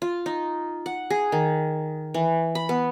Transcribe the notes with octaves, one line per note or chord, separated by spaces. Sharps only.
F4
D#4
F#5
G#4
D#3
E3
B5
B3